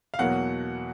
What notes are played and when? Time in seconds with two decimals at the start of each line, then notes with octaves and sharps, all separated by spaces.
0.14 F5
0.19 E2 B2 F#3 A#3 F#5